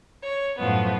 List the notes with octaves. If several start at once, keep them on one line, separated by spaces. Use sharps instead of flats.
C#5
F#2 A2 F3 B3